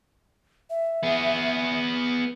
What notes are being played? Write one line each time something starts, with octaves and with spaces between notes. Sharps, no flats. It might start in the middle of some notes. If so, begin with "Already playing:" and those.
E5
B3 G#4